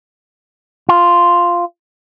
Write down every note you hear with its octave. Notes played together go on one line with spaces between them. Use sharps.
F4